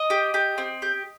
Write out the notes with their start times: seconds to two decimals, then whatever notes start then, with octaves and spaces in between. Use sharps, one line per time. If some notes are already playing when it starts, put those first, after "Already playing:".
Already playing: D#5
0.10 G4
0.34 G4
0.58 C4
0.82 G4